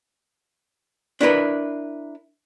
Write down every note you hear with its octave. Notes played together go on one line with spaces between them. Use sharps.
D4 E4 A#4 B4